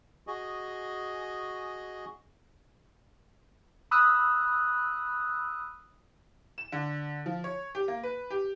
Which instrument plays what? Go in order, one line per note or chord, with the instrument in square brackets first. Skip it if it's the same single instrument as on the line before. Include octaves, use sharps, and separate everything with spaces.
[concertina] F#4 G#4 D#5
[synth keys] B5 D#6 E6 F#6
[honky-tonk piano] E7
D3
F3
C#5
G4
A#3
B4
G4